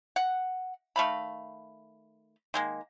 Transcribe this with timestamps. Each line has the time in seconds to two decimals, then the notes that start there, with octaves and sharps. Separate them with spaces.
0.16 F#5
0.96 D#3 A3 F5 B5
2.54 D#3 G#3 A#3